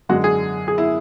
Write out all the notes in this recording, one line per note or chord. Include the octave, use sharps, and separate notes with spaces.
F#2 D3 G#3 F#4
G#4
G#4
E4